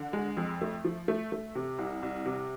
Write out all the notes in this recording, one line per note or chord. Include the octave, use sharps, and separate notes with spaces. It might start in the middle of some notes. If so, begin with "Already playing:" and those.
Already playing: D3
G#3
F2
A3
F3
A3
A3
C3
C2
C2
C3